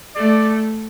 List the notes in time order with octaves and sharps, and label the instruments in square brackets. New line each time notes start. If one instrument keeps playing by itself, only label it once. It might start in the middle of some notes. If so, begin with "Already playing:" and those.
[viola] A3 [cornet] D5